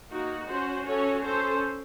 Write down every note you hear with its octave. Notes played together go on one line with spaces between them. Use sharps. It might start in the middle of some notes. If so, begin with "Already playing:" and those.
A#3 D#4 F#4
C#4 F#4 C5
C#4 F#4 A4 C#5
C#4 A4 C5